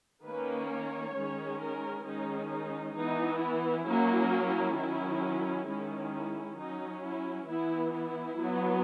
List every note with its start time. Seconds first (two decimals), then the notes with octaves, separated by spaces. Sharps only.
0.25 D#3 A#3 C#4 B4
0.71 C#5
1.15 D#3 G#3 C#4
1.61 A#4
2.06 D#3 G#3 C#4 D#4
2.51 D#4
2.96 E3 B3 D#4
3.41 E4
3.87 F#3 A#3 C#4
4.31 E4
4.76 D#3 F#3 C#4
5.67 D#3 G#3 C#4 E4
6.13 E4
6.58 F#3 C#4 D#4
7.03 E4
7.48 E3 B3 E4
7.93 E4
8.39 F#3 B3